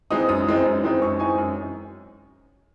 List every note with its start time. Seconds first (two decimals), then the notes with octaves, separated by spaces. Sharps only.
0.11 E3 G#3 C4 D#4 D#6
0.29 F#2 D#6
0.47 E3 G#3 C4 D#4
0.65 F#2
0.83 E3 G#3 C4 D#4
1.02 F#2 C#6
1.20 E3 G#3 C4 D#4 G#5
1.38 F#2